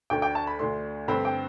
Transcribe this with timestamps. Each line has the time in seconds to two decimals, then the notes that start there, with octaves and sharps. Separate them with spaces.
0.10 D2 D3 A3 D4 G5
0.22 G5
0.35 A5
0.47 B5
0.59 D2 D3 A3 D4 C6
1.08 G2 D3 A3 C4 B5
1.25 G5